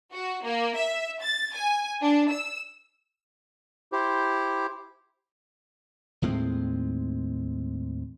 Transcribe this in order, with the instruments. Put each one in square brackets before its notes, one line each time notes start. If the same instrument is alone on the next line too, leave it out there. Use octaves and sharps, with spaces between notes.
[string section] F#4
A#3
E5
A6
G#5
D4
E6
[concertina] E4 G4 C5
[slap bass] D#2 A2 G#3 C4